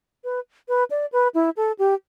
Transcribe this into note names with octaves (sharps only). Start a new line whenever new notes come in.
B4
B4
D5
B4
E4
A4
G4